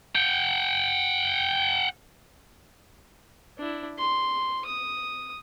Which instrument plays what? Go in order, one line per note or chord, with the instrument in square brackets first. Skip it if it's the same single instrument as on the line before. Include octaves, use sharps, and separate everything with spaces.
[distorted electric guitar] F#5 G5
[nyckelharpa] D4 E4
C6
D#6